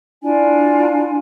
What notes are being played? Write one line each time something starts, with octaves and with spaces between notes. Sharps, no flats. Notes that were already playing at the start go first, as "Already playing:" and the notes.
D4 E4 F4 G#5